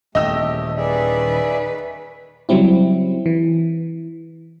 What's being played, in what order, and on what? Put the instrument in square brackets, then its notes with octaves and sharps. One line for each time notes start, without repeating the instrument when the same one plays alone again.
[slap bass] D#1 E2 [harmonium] A3 G4 [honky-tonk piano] D#5 E6
[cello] D#3 B4 [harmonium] G#4 D5 E5
[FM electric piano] C#3 F#3 G3 C4 E4
E3